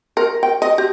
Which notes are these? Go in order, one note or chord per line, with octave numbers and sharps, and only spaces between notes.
A#4
G5
D#5
G4